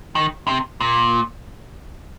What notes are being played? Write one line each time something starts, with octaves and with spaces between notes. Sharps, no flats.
D#3
C3
A#2